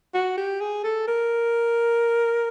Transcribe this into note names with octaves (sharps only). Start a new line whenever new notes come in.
F#4
G4
G#4
A4
A#4